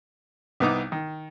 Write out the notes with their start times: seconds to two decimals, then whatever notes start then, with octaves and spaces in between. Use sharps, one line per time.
0.60 C2 B3 D#4 D6
0.92 D#3